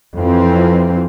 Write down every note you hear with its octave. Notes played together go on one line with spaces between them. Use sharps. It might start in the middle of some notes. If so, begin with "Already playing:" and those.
F2 E3 F3 C4